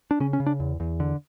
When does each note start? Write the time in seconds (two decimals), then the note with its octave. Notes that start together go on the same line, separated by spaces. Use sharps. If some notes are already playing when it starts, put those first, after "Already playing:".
0.11 D4
0.20 C#3 C#4
0.33 C#4
0.40 C#3
0.46 D4
0.60 E2
0.80 E2
1.00 D3